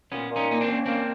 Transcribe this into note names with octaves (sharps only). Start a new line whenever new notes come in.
A#2 B3 C#4
A#2
C#4 D#4
A#3 D#4
C4 D4
C#4
A#3 C4 D4